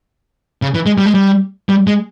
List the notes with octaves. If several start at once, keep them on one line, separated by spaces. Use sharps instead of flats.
C#3
E3
G#3
G3
G#3
G3
G3
G#3